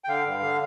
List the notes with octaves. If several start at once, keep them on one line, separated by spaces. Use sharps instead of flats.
G5
D3 F5
G2
D3